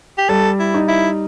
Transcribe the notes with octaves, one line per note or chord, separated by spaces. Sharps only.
G4
G3 A4
E4
D#4
E4